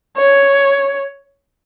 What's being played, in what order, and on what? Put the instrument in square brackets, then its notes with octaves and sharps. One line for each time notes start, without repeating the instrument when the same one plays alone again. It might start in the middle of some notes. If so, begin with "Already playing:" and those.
[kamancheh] C#5